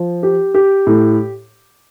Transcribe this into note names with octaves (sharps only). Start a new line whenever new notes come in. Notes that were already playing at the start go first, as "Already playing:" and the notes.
Already playing: F3
G4
G4
A2